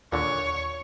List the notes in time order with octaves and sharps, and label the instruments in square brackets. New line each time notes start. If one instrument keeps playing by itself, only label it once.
[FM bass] D#2 [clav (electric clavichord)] A#2 D3 [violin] C#5